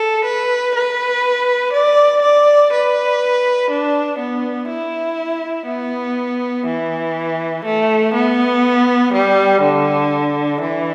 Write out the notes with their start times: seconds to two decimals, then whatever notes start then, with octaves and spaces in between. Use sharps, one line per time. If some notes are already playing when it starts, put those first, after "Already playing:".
Already playing: A4
0.25 B4
0.75 B4
1.73 D5
2.22 D5
2.72 B4
3.70 D4
4.19 B3
4.69 E4
5.67 B3
6.66 E3
7.65 A3
8.14 B3
9.13 G3
9.61 D3
10.61 E3